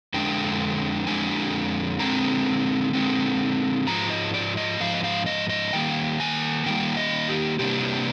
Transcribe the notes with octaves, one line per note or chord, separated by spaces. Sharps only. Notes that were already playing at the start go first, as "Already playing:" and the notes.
F2 D3 G#3 D4 G5
F2 D3 G#3 D4 G#5
D3 G#3 C4 A#5
D3 G#3 C4
G#2 F3 G#3 A#5
D#5
D5
D#5
G#2 F3 F5
D#5
F5
D#5
D#5
D#3 G3 A#3 G5
G#5
D#3 G3 A#3 G5
D#5
G4
C3 G3 A#3 D4 G4